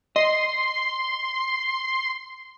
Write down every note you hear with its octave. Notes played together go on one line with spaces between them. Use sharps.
D#5 C6